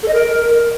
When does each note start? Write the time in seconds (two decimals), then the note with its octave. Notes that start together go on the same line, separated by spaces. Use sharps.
0.03 A4
0.08 D#5
0.14 A#4